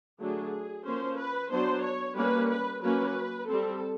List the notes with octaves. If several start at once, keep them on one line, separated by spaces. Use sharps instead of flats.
D3 F#3 A3 D4 G#4
F3 A#3 C#4 C5
B4
F#3 B3 D4 C5
C#5
G3 A#3 C#4 B4
B4
F#3 A#3 C#4 B4
G3 C4 A4